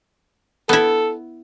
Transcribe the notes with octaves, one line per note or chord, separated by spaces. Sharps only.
B3 E4 A4